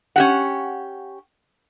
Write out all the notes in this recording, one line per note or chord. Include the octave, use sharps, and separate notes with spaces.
C#4 G4 F#5